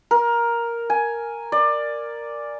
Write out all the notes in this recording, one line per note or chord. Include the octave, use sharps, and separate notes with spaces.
A#4
G#5
D5